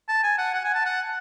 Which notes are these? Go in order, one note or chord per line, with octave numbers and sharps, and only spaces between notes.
A5
G#5
F#5
F#5
G#5
A5
F#5